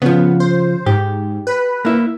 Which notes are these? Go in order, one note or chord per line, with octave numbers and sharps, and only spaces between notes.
C#3 F3 B3
C5
G#2 G4
B4
A#3 E4